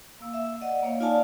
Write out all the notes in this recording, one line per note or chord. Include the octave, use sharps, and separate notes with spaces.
A#3 F5 E6
E5
D5 D#5 F#5
A#3 C#5 F5
D#4 F4 D5 F5 G#5 A5